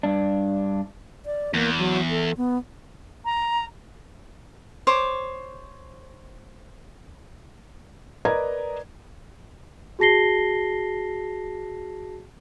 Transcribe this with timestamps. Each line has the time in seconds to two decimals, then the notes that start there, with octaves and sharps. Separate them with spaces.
0.03 G2 D4
1.26 D5
1.54 E2 A#3
1.78 F#3
2.10 A4
2.37 B3
3.25 A#5
4.87 C5 C#5 D6
8.25 A#4 B4 D5 D#5 A#5 G#6
9.99 F#4 G#4 A5 A#6 C7 G7